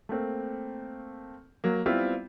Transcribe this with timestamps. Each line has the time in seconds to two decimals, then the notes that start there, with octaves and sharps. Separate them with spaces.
0.09 A3 A#3 C4
1.64 F#3 A#3
1.86 G3 B3 C4 E4 F4